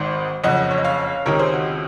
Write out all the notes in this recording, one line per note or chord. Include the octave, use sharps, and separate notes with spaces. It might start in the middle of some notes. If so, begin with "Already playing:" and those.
Already playing: G#1 G#2 D#3 C5
F#1 F2 C#3 D#5 F#5
C#5
D#5
C#5 F5
C#2 C3 D#3 A#4 C#5
G#4 C5
F#4